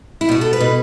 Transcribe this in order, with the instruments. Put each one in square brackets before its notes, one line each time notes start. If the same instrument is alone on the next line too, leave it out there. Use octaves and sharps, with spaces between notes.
[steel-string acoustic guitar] E4
B2 F#4
A4
B4
B2